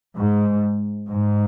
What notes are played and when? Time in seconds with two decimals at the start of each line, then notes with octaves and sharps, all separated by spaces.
0.17 G#2
1.10 G#2